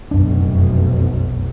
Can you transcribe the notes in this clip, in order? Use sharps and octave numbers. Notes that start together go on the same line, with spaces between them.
F1 B1 F#2 B2 D4